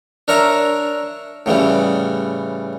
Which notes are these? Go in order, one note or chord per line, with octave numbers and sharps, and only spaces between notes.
D4 A#4 C#5 E5 A#5
A2 C#3 E3 G3